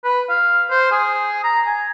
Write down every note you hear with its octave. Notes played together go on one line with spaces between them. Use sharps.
B4
F5
C5
G#4
A#5
G#5